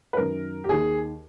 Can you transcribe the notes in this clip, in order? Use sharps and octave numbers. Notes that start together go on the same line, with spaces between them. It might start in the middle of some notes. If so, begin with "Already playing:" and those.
B4
F#2 D#3 A#4
G4
D#2 D#3 G#4